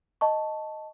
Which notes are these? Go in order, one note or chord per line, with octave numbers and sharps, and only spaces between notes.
D#5 A5 C#6